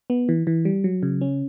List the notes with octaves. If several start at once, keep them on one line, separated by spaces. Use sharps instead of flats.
B3
E3
E3
G3
F#3
C#3
C#4